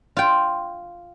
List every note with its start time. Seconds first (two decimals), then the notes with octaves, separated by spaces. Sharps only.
0.17 F4 G5